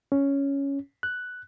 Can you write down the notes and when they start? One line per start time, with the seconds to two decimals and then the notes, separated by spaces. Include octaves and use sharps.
0.12 C#4
1.03 F#6